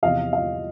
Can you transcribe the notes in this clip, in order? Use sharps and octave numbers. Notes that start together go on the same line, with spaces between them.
E2 C3 F3 D#5 F5
D#5 F5